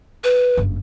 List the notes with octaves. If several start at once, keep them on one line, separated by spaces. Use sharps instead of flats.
B4
F#1 G2